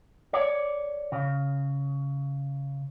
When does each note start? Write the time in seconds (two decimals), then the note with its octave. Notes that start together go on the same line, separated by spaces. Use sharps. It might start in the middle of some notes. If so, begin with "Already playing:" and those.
0.33 C#5 D5
1.12 C#3